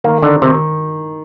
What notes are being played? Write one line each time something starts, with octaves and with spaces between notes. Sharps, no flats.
D#3 A#3
D3 D#4
C3 D#3